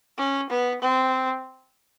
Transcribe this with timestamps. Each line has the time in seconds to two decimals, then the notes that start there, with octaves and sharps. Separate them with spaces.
0.18 C#4
0.50 B3
0.82 C4